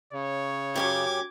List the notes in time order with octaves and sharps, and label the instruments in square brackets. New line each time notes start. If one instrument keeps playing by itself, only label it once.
[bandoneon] C#3 [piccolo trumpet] C#5
[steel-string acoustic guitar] F#2 C#4 G4 [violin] D6 G#6